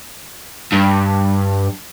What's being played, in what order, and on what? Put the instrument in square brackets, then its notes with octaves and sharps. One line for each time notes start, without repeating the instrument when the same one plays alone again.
[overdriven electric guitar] G2